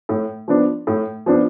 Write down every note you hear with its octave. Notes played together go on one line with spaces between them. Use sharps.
A2
F3 B3 D4
A2
F3 B3 D4